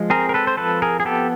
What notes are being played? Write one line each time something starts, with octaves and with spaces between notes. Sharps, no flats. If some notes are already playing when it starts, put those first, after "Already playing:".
Already playing: F3 G#3
C4 G#4 A#4
A#4
A4 B4
C5
F3 A4 B4
G#4 A#4
G#4
B3 G4 A4